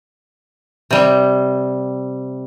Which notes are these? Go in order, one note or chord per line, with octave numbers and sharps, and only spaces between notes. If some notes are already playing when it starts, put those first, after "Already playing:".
C3 G3